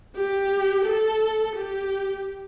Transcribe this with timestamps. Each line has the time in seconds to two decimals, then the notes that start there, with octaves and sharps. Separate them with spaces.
0.16 G4
0.85 A4
1.56 G4